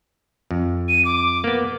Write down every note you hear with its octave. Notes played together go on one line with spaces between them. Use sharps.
F2
D#7
D6
A#3 B3